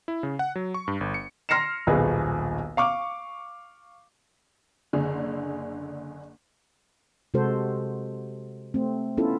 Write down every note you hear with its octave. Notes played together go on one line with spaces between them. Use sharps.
E4
C#3
F#5
F#3
C#6
G2
G1
C#7
C6 F6 A#6 C7 C#7 E7
D#1 B1 G#4 B4
F5 C#6 D6
F#1 D3 G#4
C3 G#3 F#4 A4 C5
A3 C4
B3 C#4 E4 F4 A4